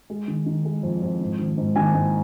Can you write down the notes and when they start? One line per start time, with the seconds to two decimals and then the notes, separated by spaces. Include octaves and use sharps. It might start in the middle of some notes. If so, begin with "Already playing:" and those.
0.10 G#3
0.28 D#3
0.46 D#3
0.65 G#3
0.83 F2
1.02 F2
1.21 G#2
1.39 D#3
1.58 G#2
1.76 D#3 G#5
1.94 G#2